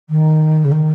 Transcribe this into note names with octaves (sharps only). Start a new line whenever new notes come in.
D#3
C#3
D#3